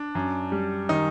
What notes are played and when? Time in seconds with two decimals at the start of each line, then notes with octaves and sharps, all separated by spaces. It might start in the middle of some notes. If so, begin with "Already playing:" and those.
Already playing: D4
0.15 F#2
0.52 G3
0.89 D#3 D#4